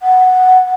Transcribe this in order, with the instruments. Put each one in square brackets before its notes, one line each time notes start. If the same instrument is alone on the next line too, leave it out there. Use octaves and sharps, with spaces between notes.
[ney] F#5